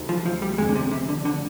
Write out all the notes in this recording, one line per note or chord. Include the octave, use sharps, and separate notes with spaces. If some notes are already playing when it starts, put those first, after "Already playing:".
Already playing: D2 C3 D#3
F3
F3
G3
F1 F2 D#3 G#3
D3
C3
C3
D3
D3